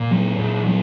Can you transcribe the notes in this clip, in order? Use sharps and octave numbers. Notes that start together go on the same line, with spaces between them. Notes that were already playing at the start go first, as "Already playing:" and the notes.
Already playing: A#2
F#3
A#2
F#3